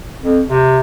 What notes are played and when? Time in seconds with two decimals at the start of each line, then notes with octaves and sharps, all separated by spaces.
0.23 F2
0.48 C3